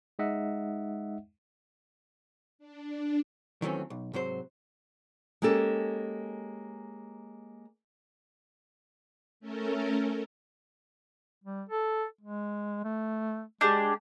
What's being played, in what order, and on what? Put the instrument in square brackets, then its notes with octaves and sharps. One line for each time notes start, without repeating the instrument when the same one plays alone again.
[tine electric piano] G#3 D#4 D#5 E5 F#5
[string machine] D4
[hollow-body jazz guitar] D#3 E3 F#3 A3 C4 C#4
B1
G#2 C3 F#3 C5
[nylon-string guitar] G#3 A#3 C#4 G4 A4
[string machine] A3 C#4 A4 A#4
[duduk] G3
A4
G#3
A3
[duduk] G#3 [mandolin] D4 G4 G#4